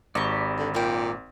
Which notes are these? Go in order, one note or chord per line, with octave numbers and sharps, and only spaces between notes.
G#1 G4 D5 A#5 B5 C#6
D3
A#2 A#3 G5